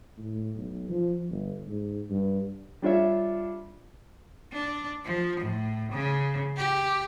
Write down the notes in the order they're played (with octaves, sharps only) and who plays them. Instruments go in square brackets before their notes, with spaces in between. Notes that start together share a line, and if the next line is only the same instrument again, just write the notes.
[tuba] A2
B1
F3
G1
G#2
G2
[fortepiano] G3 D4 F4 C#5 E5
[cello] D4
F3
A2
C#3
G4